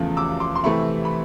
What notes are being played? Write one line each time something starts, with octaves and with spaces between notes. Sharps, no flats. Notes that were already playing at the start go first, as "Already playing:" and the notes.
Already playing: E2 C#3 F3 A3
D6 E6
C6 D6
C6
C3 E3 A3 C4 E4 B5 C#6
B5